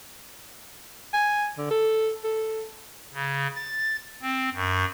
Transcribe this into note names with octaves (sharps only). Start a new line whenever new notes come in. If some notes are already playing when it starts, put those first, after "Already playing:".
G#5
D3
A4
A4
C#3
A6
C4
F#2